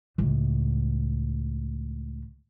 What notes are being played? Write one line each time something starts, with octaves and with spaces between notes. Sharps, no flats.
C#2 A2